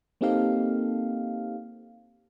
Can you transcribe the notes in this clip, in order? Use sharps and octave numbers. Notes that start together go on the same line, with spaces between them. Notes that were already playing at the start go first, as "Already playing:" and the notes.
A#3 C4 D#4 G4 A4 F5